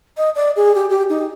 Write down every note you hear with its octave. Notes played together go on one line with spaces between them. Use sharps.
D#5
D5
G#4
G4
G4
D#4